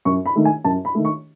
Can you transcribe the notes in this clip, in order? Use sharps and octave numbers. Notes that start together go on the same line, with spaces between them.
F#2 C#6
B5
D#3 A3
G#5
F#2 A5
B5
D#3 A3
C#6